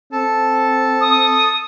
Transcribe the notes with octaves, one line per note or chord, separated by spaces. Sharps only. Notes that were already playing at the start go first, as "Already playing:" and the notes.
C4 A4 A5
D#6